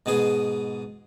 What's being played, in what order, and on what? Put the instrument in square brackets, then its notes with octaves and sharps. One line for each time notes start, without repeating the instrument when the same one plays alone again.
[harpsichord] G#2 B2 B3 G#4